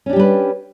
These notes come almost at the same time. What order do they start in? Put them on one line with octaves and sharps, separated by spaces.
C#4 D4 G4 G3 B4